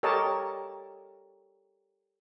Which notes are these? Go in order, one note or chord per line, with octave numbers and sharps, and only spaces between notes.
G4 A4 A#4 C#5 D#5 A5